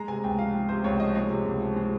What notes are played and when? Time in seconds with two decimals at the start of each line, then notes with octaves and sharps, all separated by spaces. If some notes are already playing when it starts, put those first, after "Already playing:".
Already playing: G#3 A#5
0.08 C3 G#5
0.24 C#2 G5
0.39 F3 F5
0.54 G#3
0.69 C3 C5
0.84 C#2 C#5
1.00 F3 D#5
1.15 G#3 C#5
1.30 C3
1.45 C#2
1.60 F3
1.76 G#3